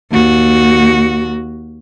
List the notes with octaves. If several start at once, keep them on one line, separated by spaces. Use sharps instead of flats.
D#2 F#4